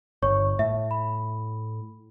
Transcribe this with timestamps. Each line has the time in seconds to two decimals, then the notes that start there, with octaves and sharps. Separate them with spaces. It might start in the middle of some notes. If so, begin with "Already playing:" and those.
0.22 G1 C#5 C#6
0.59 A2 E5
0.91 B5